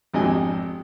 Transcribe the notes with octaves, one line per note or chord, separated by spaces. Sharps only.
G#1 F2 D4 G4 D#5 G#5